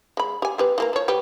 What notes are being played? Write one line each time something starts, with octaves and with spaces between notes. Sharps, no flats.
G#3 B5
G4 G#5
C4 G4 B4
E3 A#3 A#5
F3 C#5
G3 G4 B4